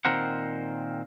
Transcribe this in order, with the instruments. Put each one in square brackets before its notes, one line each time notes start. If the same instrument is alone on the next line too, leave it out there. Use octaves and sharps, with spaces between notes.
[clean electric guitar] A#2 D#3 C4 A#4 C5 F#5